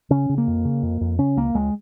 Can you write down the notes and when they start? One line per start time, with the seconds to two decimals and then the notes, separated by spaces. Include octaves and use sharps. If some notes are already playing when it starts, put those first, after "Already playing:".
0.10 C#3 C#4
0.29 C#3
0.38 A#3
0.47 F2
0.65 C#3
0.83 F2
1.01 F2
1.18 C#3 C#4
1.37 C#2 A#3
1.54 C#2 G#3